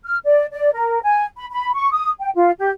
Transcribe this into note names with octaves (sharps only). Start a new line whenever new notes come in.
F6
D5
D5
A#4
G#5
B5
B5
C#6
D#6
G5
F4
G4